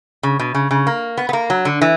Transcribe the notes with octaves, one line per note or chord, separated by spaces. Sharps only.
C#3
B2
C#3
C#3
A#3
B3
B3
A#3
F#3
D3
E3